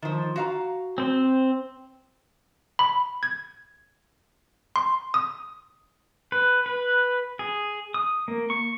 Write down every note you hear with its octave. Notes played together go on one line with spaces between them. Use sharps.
D#3 F3
F#4 F5 A#5
C4 C5
B5
G#6
C6
D#6
B4
B4
G#4
D#6
A#3
C#6